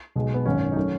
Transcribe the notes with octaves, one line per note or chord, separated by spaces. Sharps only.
B1 B2 G#3
B3
G#1 F#2 D#3 C#4
D#4
D#3 F#3 A3 C#4